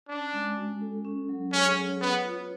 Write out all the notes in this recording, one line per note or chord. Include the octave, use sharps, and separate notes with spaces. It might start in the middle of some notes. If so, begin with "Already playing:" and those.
C#4 D4
G#3
F#4
A4
C#4
F#3
C#4 G#4
C#5
B3 B4
F4